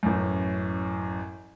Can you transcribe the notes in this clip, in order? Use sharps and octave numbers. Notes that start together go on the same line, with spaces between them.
A1 F#2